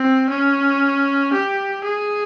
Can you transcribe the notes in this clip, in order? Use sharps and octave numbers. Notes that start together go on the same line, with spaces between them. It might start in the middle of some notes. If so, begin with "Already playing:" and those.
Already playing: C4
C#4
G4
G#4